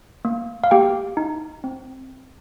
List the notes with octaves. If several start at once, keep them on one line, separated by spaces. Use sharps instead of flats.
A#3
F5
A#3 G4 G5
D#4
C4